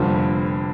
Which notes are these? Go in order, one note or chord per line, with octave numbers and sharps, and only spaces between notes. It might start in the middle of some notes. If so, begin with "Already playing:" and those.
Already playing: F1 F2 D3 G3 A#3